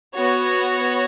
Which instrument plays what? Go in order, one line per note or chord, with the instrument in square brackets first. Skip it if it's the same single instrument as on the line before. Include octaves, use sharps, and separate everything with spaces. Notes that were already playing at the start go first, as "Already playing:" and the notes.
[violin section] B3 F#4 C#5